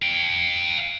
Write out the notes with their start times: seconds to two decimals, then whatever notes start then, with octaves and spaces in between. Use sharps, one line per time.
0.02 F5 G5